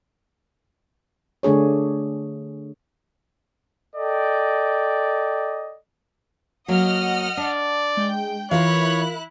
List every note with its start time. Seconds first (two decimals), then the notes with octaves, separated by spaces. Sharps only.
1.43 D3 A3 D4 G#4 C#5
3.96 A4 D5 D#5 G5
6.68 F#3 A#3 D#5 F#5 F6
7.37 D4 D5
7.97 G#3 G5
8.51 E3 E4 F4 A#4 C#5 F5 F#6